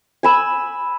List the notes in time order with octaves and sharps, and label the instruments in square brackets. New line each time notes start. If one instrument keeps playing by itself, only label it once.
[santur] G#5 B5 E6